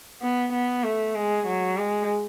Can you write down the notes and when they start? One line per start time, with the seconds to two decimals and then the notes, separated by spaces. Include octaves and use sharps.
0.21 B3
0.53 B3
0.84 A3
1.15 G#3
1.47 F#3
1.78 G#3